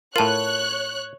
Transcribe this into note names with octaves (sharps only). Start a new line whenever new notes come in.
A2 F4 A#4 C#5 A5 F#6